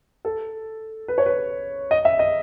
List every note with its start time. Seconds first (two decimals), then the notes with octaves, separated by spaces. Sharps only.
0.25 A4
1.08 B4
1.18 C#5
1.26 B4
1.91 D#5
2.05 E5
2.19 D#5